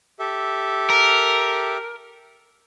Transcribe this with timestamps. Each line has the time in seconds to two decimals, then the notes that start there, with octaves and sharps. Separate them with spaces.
0.19 G4 A4 E5
0.90 A#4